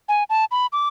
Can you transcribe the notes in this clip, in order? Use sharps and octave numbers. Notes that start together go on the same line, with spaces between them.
G#5
A5
B5
D6